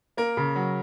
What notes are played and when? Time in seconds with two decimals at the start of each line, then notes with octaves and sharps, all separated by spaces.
0.17 A#3 A#4
0.37 C#3
0.56 F#3